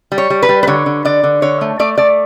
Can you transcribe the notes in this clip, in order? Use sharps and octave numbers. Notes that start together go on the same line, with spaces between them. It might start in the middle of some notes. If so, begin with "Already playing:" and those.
G3
C#5
G3
B4
G3
B4
D3 C#5
D3
D3 D5
D3
D3 C#5
A3
A3 D5
A3 D5